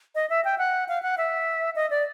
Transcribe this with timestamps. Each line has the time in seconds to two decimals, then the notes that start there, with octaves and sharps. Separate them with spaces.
0.15 D#5
0.30 E5
0.44 G5
0.58 F#5
0.88 F5
1.02 F#5
1.18 E5
1.75 D#5
1.90 D5